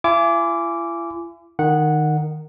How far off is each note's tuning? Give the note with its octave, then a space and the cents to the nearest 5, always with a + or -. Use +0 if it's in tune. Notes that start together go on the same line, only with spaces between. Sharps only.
E4 +45 G#5 +0 D6 -15
D#3 -15 F#5 -10